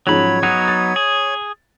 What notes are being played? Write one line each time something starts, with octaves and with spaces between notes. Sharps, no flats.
G#2 F3 F#3 C#4 C#5 B5
F#3 B3 D#4 G#6
A6
G#4